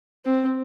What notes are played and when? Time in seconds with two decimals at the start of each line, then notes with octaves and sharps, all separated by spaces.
0.25 C4